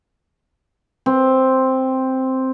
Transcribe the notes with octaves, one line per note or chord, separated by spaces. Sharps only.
C4